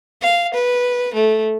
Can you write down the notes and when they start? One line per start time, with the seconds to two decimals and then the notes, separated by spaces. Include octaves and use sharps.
0.22 F5
0.54 B4
1.14 A3